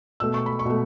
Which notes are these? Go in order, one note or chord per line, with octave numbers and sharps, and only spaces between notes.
B2 A3 E6
C#6
B5
C#6
B2 A3